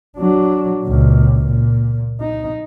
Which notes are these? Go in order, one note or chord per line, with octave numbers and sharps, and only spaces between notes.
F#3 D4
C#2 A#2
A#2
D#4